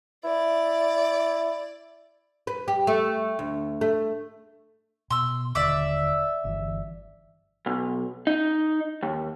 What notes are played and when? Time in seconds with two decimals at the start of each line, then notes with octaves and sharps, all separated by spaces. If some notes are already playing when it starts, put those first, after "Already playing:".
0.24 E4 D5
2.47 B4
2.68 G4
2.87 A3
3.39 D2
3.81 A3
5.10 B2 C6 E6
5.55 D#1 D3 D5 E5 D6
6.45 G1 E3
7.66 B1
8.27 D#4
9.03 D#2